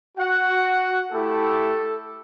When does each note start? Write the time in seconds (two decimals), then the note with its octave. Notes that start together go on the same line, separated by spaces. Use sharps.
0.18 F#4 F#5
1.12 A3 E4 G4 A4